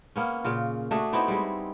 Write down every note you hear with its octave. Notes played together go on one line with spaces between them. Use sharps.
A#3 B3 C#4
A#2 C#3 F4
A3 D4 F#4 G#4
B3 C4 D#4 E4
G3 G#3